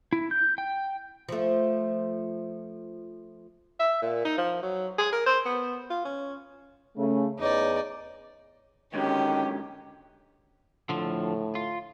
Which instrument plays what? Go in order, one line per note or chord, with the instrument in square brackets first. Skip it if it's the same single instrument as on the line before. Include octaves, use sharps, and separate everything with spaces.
[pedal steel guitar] E4
G6
G5
[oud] F3 A3
[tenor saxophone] E5
A#2
D#4
F3
F#3
G#4
A#4
C5
B3
F4
C#4
[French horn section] C#3 A3
[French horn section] E2 C#5 [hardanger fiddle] D#4 D5
[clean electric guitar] G#2 D3 F#3 [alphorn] D#3 [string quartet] C#4 G4
[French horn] A2 [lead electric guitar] D3 F3
[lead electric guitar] F4